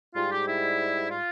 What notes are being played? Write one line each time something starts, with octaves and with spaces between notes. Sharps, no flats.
G#2 G3 F4
G4
E4
F4